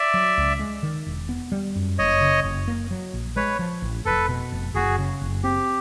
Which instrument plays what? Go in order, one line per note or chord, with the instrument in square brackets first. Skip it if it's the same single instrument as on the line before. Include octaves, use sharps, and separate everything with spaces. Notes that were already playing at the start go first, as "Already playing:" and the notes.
Already playing: [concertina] D5 E5
[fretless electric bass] F#3
C#2
G#3
D#3
E1
B3
G3
F#2
[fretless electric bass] F#1 [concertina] C#5 D#5
[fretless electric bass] C#3
F#1
A#3
F#3
A#1
[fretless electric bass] G#3 [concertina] B4 C#5
[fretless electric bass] F3
A1
[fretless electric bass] F1 [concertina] A4 B4
[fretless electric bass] B2
F1
[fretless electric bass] F#1 [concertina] F#4 G#4
[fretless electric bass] C#3
F#1
[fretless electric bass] C4 [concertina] G4